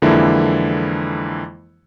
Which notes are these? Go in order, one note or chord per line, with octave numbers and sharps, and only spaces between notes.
F2 D3 E3 G#3 A#3 E4